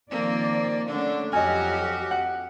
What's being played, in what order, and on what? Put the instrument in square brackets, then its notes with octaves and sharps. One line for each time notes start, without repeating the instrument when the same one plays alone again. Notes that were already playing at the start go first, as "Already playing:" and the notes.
[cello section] D#3 F3 D5 [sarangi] A#3 [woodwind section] C4
[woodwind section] D3 [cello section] A3 C#4 [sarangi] D4
[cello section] F2 G4 [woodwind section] F#3 F6 [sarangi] F#4 [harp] D#5 G#5
[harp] F#5